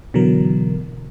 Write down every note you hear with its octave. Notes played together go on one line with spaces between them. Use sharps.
B2 D3 E3 F#3 A#4